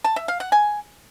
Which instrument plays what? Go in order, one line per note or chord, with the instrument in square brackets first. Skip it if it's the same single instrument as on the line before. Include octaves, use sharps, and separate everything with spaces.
[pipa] A5
E5
F5
F#5
G#5